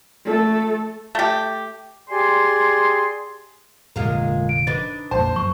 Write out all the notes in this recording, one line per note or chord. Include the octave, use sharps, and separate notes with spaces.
A3 A4
A3 G4
G4 G#4 D5 G5 G#5 C6
F1 A#2 D3 G#3 F4 A#4
D7
D4 D#4 B4 A6
A#1 F2 A#3 C5 A5
F#2 F#3 C#6